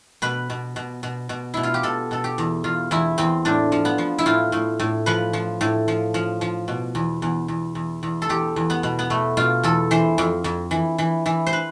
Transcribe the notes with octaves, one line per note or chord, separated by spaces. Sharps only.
B2 B4
B2
B2
B2
B2
B2 E4
F4
G4
B2 A4
B2 A4
G4
E2
E2 F4
E2 E4
E2 C4
A2 D4
F3
B3
F3
E4
A2 F4
A2
A2
F3 B4
F3
A2
F3
F3
F3
B2
E2
E2
E2
E2
E2
A4
E2 G4
E2
B3
B2
B3
B2 A3
B2 F4
E2 A4
E3 C5
F2
F2
E3
E3
E3
C5
B4